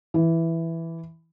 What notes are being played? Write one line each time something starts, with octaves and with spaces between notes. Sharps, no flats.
E3